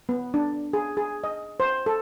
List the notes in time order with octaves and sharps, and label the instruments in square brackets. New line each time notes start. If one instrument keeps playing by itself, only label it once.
[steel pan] B3
D4
G#4
G#4
D#5
C5
A4